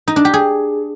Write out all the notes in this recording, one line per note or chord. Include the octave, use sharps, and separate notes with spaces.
D#4
D4
G4
G#4